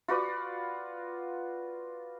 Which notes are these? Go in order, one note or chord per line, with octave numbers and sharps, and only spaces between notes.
F4 F#4 B4 D5